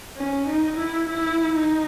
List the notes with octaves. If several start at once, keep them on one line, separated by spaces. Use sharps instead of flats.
C#4
D#4
E4
E4
D#4